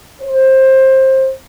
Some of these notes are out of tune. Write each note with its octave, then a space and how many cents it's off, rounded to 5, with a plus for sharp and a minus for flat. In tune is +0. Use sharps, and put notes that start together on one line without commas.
C5 +20